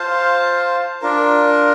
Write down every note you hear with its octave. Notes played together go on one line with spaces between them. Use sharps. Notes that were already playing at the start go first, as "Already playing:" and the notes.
Already playing: F4 C5 F5 A5
D4 F4 A#4